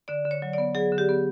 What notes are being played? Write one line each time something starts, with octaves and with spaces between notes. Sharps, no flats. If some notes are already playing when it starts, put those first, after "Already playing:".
D3 D5
D3
C#5
F#3
B3 D5
F#3 G#4
D3
G4
B3